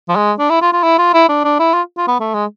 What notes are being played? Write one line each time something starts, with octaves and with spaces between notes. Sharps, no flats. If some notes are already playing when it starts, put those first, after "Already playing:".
F3
G#3
D4
E4
F4
F4
E4
F4
E4
D4
D4
E4
F4
F4
B3
A3
G#3